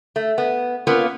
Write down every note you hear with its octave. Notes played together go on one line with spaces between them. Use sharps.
A3
B3
A#3 B3 C#4 F4